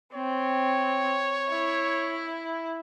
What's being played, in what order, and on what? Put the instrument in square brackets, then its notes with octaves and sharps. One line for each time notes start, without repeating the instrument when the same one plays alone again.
[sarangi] C4 [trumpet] C#5
[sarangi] E4